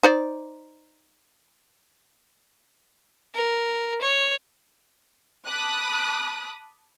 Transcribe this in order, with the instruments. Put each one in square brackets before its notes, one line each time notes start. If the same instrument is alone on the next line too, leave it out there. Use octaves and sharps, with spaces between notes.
[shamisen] D#4 C5 D5
[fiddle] A#4
C#5
[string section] A5 B5 D6 D#6 F#6